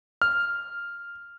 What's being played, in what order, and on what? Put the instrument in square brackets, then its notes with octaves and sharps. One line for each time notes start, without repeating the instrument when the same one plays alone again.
[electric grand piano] F6